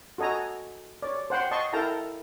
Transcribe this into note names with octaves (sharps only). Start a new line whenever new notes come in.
F#4 A4 D#5 G#5 A#5
C#5 D5
C5 F#5 G5 C6
D#5 A5 C6 C#6
E4 A4 A#4 G5 A5 A#5